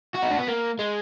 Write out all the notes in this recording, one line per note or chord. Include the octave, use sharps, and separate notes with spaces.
F#4
D#4
D4
B3
A#3
G#3